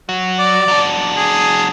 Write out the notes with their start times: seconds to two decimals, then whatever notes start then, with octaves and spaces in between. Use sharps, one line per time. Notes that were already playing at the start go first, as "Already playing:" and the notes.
0.09 F#3
0.39 D5
0.68 F#3 D4
1.17 G#4